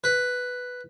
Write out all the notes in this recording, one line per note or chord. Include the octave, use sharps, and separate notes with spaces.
B4